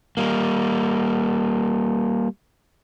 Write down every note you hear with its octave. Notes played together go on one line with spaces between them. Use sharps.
G3 A#3